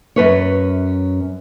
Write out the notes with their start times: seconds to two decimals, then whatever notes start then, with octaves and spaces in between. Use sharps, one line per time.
0.16 F#2 B4 C#5